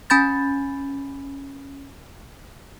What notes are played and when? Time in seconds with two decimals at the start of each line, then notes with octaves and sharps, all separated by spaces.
0.10 C#4 G#5 B5 G6 A6